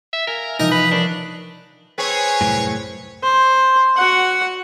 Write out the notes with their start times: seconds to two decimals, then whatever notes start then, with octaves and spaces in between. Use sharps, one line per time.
0.13 E5
0.27 A#4 E5 F5 G#5
0.60 C3 E3 F3 D#4 A#4
0.72 B4
0.91 D4 A#4 C#5 E5
1.98 C4 G#4 B4 C#5
2.41 C2 F#2 A2
3.23 C5
3.97 F#4 F#5